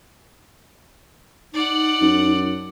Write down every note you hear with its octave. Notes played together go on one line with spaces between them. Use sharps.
D#4 D5 F#5
F#2